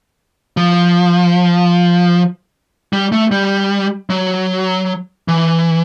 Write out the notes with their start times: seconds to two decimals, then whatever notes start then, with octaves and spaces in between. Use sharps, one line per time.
0.57 F3
2.93 G3
3.12 A3
3.31 G3
4.10 F#3
5.28 E3